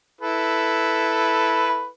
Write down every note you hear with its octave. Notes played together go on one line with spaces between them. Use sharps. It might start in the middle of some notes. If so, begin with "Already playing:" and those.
E4 A4 B4